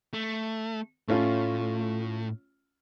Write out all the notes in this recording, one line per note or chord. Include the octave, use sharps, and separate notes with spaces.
A3
A2 A3 C#4 F4